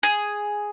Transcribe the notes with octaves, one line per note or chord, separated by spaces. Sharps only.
G#4